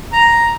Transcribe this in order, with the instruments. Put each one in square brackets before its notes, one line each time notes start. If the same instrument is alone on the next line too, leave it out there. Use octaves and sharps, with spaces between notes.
[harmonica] A#5